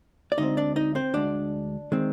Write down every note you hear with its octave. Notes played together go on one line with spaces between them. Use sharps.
D5
D2 D3 G#3 C4 D#4 D#5
D4 D5
D#4 D#5
C4 C5
D2 D3 G#3 D4 D5
D#3 G#3 C4